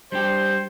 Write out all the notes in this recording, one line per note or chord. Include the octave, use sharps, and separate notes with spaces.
G3 D4 G4 C5